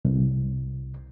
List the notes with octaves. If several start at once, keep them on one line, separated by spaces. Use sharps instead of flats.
C2